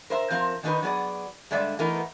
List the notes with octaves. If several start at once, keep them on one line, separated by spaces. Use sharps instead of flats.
A#4 C5 E5
F3 C4 A#4
D#3 D4 D#4 G4 A#4 B4
F#3 B3 G#4 D5
G2 D3 G#3 D5 E5
E3 A3 B3 D#4 A#4